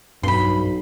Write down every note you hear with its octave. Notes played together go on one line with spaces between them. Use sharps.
B1 G2 B5 C6